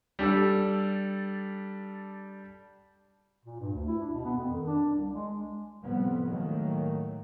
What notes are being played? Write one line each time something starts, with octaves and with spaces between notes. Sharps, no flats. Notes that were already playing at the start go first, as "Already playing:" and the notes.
G3 D4 A4 E6
A#2
G2
D2
E4
D4
B2
B3
F2
D#3
D4
C2
G#3
F2 A2 C3 G3 B3 C4
A2 D#3 F#3 A3 A#3